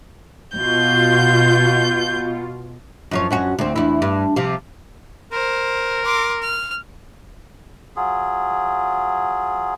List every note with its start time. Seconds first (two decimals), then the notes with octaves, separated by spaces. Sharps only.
0.57 B2 F4 G6
3.11 F#2 F3 C#5
3.30 F#2 C#4 F#4
3.59 D2 C4
3.76 E2 E4
4.02 G2
4.36 C3 F3
5.32 A#4 C5
6.05 C6 D6
6.42 F6
7.96 F#3 F4 G#4